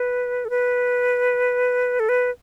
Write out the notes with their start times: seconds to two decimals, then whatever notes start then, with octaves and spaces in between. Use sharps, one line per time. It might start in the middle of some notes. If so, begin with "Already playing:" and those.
Already playing: B4
0.45 A4
0.50 B4
2.00 A4
2.09 B4